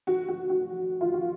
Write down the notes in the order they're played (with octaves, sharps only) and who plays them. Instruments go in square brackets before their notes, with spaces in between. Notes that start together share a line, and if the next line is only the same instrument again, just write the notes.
[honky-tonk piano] F#4
F#4
F#4
F4
F#4